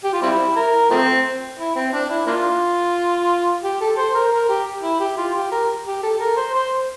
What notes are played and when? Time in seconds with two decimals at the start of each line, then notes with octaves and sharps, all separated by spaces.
0.04 G4
0.13 F4
0.22 G3 C4 E4
0.56 A#4
0.90 F3 A3 C4
1.59 E4
1.75 C4
1.93 D4
2.10 E4
2.27 A#3 D4 F4
3.63 G4
3.81 A4
3.97 C5
4.15 A#4
4.32 A#4
4.49 G4
4.83 E4
5.00 G4
5.17 F4
5.34 G4
5.52 A#4
5.86 G4
6.03 A4
6.20 A#4
6.37 C5
6.54 C5